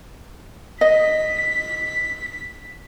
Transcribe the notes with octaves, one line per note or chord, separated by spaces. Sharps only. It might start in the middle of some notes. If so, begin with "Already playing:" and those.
D#5 B6